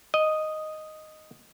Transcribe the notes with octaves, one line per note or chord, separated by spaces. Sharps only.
D#5